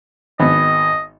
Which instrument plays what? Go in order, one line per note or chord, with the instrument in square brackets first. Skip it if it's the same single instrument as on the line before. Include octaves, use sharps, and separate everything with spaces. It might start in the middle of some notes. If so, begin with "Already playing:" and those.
[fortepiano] G#1 B3 [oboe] D#5